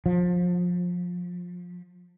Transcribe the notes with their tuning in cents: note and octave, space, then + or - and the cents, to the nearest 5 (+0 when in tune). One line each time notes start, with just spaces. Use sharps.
F3 +25